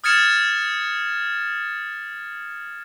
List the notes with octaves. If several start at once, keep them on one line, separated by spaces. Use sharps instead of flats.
D#6 F6 G#6 A6 C#7 E7